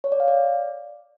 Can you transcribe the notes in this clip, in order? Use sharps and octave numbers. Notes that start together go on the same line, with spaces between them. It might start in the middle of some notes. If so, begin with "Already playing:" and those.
C#5
D5
F5
D5